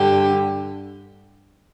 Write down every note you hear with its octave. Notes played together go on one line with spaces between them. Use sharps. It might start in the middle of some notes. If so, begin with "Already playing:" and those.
Already playing: G2 D3 G4